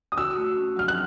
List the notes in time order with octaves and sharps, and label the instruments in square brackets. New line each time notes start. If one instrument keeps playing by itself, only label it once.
[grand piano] D#6
[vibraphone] F#4 [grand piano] E6
[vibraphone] A3
C#4
[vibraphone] F#3 [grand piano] F6
[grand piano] F#6